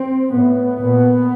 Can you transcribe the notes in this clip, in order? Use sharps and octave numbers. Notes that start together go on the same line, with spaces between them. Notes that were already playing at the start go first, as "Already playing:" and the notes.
Already playing: C4
A2 B3
A#2